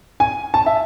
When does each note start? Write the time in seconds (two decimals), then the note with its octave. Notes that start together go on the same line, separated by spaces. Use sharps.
0.20 G#5
0.54 A5
0.66 E5